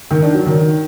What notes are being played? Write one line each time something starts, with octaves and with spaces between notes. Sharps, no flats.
D#3
D4
F#3
D#3